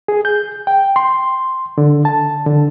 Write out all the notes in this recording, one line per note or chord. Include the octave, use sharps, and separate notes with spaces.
G#4
G6
G5
C6
D3
A5
D3